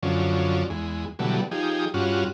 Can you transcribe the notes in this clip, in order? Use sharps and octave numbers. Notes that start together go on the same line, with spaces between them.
F#2 D3 F3 C#4
E2 G#3
B2 D3 E3 F#3 G3 A3
F3 D#4 G4 G#4
G2 C#4 F4 F#4